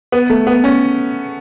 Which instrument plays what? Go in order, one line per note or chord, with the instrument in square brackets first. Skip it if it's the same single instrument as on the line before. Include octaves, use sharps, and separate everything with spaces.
[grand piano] B3
A3
B3
C#4